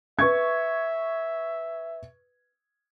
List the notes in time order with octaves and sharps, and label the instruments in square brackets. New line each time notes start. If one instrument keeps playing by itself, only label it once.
[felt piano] B4 C#6 G#6 [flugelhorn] E5